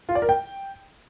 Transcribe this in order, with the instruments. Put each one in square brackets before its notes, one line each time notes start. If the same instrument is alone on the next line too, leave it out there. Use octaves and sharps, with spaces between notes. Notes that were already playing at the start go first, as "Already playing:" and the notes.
[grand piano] F4
D5
A#4
G5